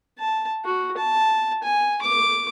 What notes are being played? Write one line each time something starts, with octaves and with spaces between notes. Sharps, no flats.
A5
F#4
A5
G#5
D6